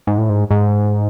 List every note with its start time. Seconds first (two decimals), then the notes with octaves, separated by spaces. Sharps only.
0.07 G#2
0.18 A2
0.29 G#2
0.51 G#2